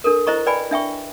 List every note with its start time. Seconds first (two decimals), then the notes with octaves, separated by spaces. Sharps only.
0.04 D4 A4 A#4
0.27 E4 C5 D#5 A#5 C#6
0.46 B4 D5 G5 G#5 B5
0.71 D4 E5 G5 C#6